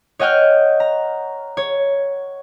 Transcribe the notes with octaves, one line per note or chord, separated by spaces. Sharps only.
C#5 D#5 F#5 G5 F6 G6
A#5
C#5